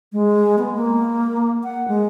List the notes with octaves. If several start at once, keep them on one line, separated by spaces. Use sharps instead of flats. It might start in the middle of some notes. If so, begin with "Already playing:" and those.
G#3
B3
A#3
F#5
G#3